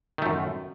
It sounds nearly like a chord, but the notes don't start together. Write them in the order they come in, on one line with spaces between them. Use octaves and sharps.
D#3 A3 F#2